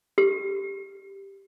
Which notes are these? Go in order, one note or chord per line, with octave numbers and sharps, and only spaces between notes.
G4